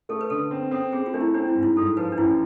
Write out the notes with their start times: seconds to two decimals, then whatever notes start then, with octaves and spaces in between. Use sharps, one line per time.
0.09 A3 A4
0.21 B4
0.30 D3 A4
0.51 C4
0.71 C4 A4
0.92 C4 G#4
1.06 F4
1.14 A3 D4
1.21 E4
1.34 C4 D4
1.48 E4
1.55 G#2
1.63 E4
1.76 G#2 A4
1.97 F3 B4
2.12 D4
2.18 A1 E4